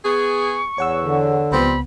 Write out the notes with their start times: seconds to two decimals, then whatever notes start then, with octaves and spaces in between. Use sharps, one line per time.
0.05 B3 G#4 C#6
0.78 E2 C#5 F#5 E6
1.03 D3
1.52 C#2 F3 G3 B3 C4 B5